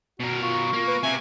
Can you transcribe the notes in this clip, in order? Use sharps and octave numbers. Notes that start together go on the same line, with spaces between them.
B2 F#4 A#4
F4 C#6
A#3
B4
C3 E5 G#5